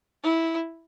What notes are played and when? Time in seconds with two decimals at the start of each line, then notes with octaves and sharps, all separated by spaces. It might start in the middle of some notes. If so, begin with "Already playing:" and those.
0.23 E4